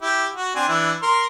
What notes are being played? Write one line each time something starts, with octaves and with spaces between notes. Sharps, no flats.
E4 G4
F#4
C4 D4 G#5
E3 D4 E4
A#4 C6